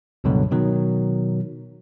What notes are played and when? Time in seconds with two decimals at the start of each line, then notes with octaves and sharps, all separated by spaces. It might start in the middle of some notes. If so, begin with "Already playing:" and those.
0.24 C#2 G2 B2 D3 F#3
0.51 B2 D#3 F#3